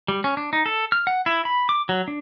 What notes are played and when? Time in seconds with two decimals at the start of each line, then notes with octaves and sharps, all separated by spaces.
0.08 G3
0.24 C#4
0.37 D4
0.53 D#4
0.66 A4
0.92 F6
1.07 F#5
1.26 E4
1.45 B5
1.69 D6
1.89 F#3
2.08 D4